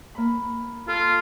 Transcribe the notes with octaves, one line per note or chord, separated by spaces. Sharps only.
A#3 B5
F4 A4